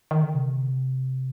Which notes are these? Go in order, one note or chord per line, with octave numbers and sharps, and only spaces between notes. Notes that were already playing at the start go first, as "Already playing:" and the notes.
D#3
D3
C3